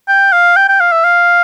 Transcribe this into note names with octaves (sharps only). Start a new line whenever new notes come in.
G5
F5
G5
G5
F5
E5
F5